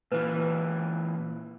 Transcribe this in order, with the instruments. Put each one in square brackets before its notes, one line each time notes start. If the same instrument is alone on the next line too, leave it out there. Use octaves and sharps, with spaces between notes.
[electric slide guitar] A#2 E3 [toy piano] B4